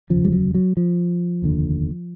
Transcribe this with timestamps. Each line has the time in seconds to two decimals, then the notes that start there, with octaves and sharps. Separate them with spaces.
0.10 F1 D#2 C#3 F3
0.25 G3
0.32 F#3
0.55 F#3
0.77 F3
1.42 F1 D#2 D3